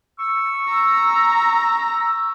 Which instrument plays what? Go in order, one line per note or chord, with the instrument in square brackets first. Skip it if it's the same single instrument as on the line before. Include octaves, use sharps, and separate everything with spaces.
[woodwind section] C#6 E6
[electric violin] A#5